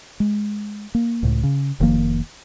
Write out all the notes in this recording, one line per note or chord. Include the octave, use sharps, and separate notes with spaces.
G#3
A#3
C#2 A2
C#3
F1 D#3 F3 A#3